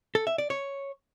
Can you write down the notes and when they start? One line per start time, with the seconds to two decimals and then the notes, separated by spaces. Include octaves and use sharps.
0.15 A4
0.27 E5
0.38 D5
0.50 C#5